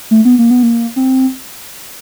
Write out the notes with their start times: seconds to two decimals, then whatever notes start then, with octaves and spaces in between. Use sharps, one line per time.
0.11 A3
0.25 B3
0.39 A#3
0.51 B3
0.63 A#3
0.96 C4